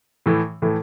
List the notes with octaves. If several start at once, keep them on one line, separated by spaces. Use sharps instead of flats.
A2 E3 A3
A2 E3 A3